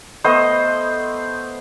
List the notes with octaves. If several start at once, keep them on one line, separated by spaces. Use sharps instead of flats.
A3 B3 C5 D#5